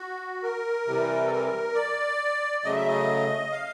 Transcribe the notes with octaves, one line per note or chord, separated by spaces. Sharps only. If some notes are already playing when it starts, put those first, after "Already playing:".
Already playing: F#4
A#4
C3 E3 G3
A4
A#4
D5
C#3 F#3 A3 D#5
E5
D#5
F5